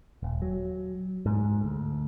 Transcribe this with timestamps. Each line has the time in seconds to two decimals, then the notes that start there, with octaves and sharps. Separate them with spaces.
0.23 D#1
0.42 F#3
1.26 G#2
1.64 D2